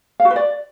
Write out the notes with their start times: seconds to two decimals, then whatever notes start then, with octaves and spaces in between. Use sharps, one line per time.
0.20 F5
0.25 F#4
0.30 B4
0.36 D5